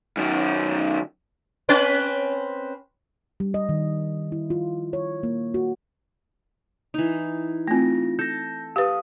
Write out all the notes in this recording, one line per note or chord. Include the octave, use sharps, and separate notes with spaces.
F#2 D#3
C4 C#4 B4
G3
D#5
D#3
E4
F4
C#5
A#3
F#4
E3 D#4
A3 C4 F4 A#6
A4 G6 A#6
G4 B4 F5 D#6